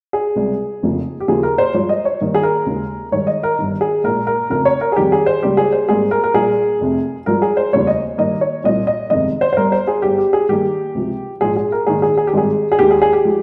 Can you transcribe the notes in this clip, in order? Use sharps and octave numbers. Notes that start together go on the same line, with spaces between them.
G#4
C#2 C3 G3
F1 F2 C#3 F3 A#3
G4
D#2 C#3 F3 A#3 G#4
A#4
C5
G2 F3 G#3 C#5
D#5
C#5
G2 D#3 A#3
G#4
A#4
D#2 C#3 G#3
G2 D#3 G#3 C#5
D#5
A#4
G1 G2 D#3
G#4
A#1 A#2 G#3 A#4
A#4
F1 F2 C#3 A#4
C#5
A#4
G#4
F2 D#3 G3 G4
G#4
C5
C#2 C#3 G3 A#3 G4
G#4
C5
G#1 G#2 G3 A#3 G#4
A#4
A#4
A#1 A#2 G3 A#3 G#4
F1 F2 C3
G2 F3 G#3 A#4
G#4
C5
F1 D#2 C#3 G3 A#3 C#5
D#5
G2 D#3 A#3 D#5
C#5
C2 A#2 G3 A#3 D#5
D#5
G1 F2 C3 D#3 G#3 D#5
C5
C5
G1 G2 G3 A#4
C5
G#4
G1 G2 G3 G4
G4
G#4
G2 D#3 A#3 G4
C#2 C3 F3
A#1 G#2 F3 G#4
G#4
A#4
A#1 G#2 D#3 A#3 G#4
G#4
G#4
G4
G#1 G2 D#3 G#3 G#4
G#4
D#2 D#3 G#3 G4
G#4
G#4
G4
F3 G#3